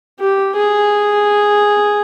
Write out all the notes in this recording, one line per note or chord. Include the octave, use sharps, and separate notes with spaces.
G4
G#4